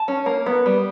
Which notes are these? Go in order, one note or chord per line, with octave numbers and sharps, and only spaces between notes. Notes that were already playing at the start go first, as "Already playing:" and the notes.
Already playing: A5
C#4
A#3
B3
G3